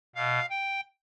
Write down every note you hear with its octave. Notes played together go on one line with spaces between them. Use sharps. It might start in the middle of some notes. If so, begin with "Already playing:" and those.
B2 F5
G5